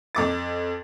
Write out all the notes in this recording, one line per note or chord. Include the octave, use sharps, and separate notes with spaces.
F2 D6 A6